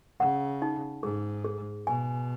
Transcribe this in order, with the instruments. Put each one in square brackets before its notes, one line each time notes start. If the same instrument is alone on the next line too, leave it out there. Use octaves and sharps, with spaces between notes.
[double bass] C#3 [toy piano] F#5
[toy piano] D#4
[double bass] G#2 [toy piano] G#4
[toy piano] G#4
[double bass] B2 [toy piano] G#5